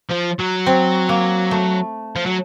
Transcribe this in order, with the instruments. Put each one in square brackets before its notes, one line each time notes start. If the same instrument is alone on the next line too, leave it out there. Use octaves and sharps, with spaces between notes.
[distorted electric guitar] F3
F#3
[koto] C4
A#3
A3
[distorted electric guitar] F3
F#3